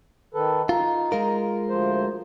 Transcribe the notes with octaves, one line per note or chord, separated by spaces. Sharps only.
D#3 A4 B4
D#4 F4
G#3 F4 A#4
D2 F3 C5